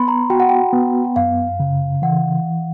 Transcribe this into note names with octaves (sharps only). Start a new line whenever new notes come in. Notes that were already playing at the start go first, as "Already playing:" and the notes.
Already playing: B3 B5 C6
A#5
F#4 G5
F#5
G5
B3
F#2 F5
C#3
E3 F#5